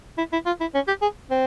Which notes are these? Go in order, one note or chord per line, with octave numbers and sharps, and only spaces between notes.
E4
E4
F4
E4
C#4
G4
G#4
C4